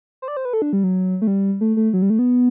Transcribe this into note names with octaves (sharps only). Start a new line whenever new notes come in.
C5
D5
C5
B4
A4
D4
G3
F#3
A3
G3
A3
A3
F#3
G3
A3
B3